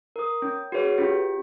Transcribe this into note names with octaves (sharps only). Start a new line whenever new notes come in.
A#4 D#6
C#4
F#4 G#4 B4 C#5
C#4 F4 G4